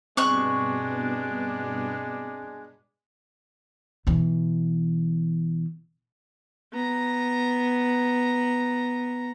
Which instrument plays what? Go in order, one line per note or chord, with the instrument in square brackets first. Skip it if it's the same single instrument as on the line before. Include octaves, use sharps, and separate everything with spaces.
[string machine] G2 B2 B3 [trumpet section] G#3 D4 [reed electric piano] C4 [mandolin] C#6 F#6
[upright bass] B2 E3
[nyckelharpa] B3 A#5